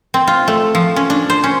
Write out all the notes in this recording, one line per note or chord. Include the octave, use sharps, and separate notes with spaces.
C4
F4
A3
F3
C#4
D4
C5
C#4